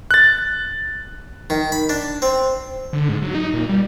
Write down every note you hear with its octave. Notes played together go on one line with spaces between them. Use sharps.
F#6 A6
D#3
B5
D4
C4
D3
G#2
F#3
D#4
A#2
G3